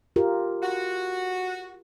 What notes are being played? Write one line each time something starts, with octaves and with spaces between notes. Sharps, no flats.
F4 G4 A#4
F#4